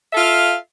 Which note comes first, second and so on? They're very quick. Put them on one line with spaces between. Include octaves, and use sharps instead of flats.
E5 A4 F4 F5